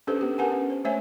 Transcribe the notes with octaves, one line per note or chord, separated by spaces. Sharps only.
C#4 D4 G4 A4 B4 C5
B3 G4
G4 A#4 B4 F#5 G#5 A5
C#4
C5
A3 C5 C#5 E5 G#5